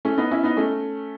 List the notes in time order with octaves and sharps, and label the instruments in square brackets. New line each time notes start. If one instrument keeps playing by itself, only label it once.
[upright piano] A3 C#4
B3 D#4
C#4 E4
B3 D#4
A3 C#4